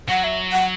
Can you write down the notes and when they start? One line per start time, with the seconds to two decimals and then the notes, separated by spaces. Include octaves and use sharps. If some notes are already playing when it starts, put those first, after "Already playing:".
0.09 F#3 F#5
0.24 E5
0.52 F#5